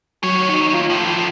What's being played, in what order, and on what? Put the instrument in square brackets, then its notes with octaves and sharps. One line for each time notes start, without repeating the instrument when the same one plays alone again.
[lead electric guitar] D#3 C#5 [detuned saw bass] F#3
[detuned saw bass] D#4
F4
[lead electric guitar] A2 F3